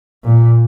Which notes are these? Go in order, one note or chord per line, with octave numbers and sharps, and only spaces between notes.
A#2